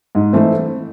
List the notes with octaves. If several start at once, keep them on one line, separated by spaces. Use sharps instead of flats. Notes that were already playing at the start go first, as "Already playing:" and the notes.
G#2
E3 A3 C4